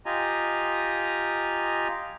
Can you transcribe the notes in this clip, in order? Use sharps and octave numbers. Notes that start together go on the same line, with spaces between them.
F4 G4 D#5 G#5 A#5